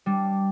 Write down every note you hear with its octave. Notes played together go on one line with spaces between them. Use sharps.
G3 D4